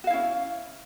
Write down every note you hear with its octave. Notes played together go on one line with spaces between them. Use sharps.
C#4 E4 F#4 F5